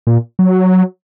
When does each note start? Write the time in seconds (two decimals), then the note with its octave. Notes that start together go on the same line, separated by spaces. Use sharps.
0.07 A#2
0.39 F#3